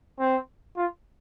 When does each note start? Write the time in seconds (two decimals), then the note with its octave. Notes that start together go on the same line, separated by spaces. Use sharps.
0.19 C4
0.77 F4